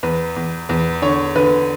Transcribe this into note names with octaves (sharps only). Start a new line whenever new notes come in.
E2 B4
E2
E2 B4
D3 C#5
D3 B4